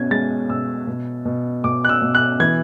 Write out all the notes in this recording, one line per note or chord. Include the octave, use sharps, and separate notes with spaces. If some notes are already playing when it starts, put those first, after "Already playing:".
Already playing: B2 C#4 G#6
G#3 A6
B2 E6
B2
B2
B2 D6
F#6
E6
B2
F#6
E3 G#6